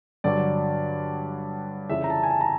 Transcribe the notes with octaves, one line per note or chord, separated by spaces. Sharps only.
G2 D3 F#3 D5
F2 C#3 E3 E5
A#5
A5
G#5
A5
A#5